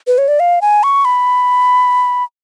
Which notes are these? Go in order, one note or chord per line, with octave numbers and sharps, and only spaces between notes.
B4
C#5
D5
F5
G#5
C#6
B5